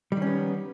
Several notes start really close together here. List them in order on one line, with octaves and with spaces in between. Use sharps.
G3 D#3 C#4 B3